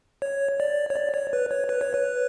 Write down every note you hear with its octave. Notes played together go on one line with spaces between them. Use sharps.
C#5
D5
C#5
D5
C#5
B4
C#5
B4
C#5
B4